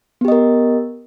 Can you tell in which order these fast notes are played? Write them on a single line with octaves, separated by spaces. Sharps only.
B3 G4 D#5 A#4